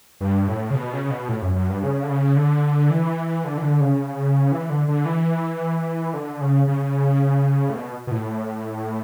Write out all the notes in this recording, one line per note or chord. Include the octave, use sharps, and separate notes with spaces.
G2
A2
C#3
B2
C#3
C#3
B2
A2
F#2
F#2
G2
C#3
D3
C#3
D3
E3
D3
E3
D3
C#3
E3
D3
D3
E3
D3
C#3
C#3
A2
B2
B2
A2